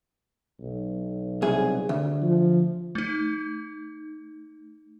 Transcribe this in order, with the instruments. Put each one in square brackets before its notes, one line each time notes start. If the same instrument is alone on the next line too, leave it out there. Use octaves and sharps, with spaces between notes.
[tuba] B1
[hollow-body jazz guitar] C2 G#4
D2
[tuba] F3
[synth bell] A3 D#4